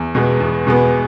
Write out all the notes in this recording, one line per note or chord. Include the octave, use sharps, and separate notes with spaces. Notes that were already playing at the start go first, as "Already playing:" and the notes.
Already playing: E2
B2 G#3 B3
E2
B2 G#3 B3